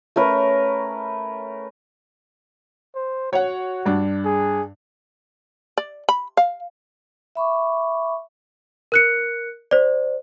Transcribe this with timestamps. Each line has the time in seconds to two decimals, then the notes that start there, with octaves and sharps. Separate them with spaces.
0.16 A3 C#4 A#4 B4
2.95 C5
3.33 F#4 C#5 F#5
3.86 G2 D4
4.25 G#4
5.77 D5
6.09 B5
6.37 F5
7.35 E5 B5 C#6 D6
8.92 A#4 F#6 C#7
9.71 C5 D5